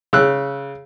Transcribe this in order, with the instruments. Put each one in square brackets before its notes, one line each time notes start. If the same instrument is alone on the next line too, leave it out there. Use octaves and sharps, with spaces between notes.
[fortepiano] C#3 E6 F#6